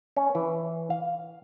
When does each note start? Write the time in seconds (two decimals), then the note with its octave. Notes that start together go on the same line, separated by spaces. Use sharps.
0.16 C#4
0.35 E3
0.90 F5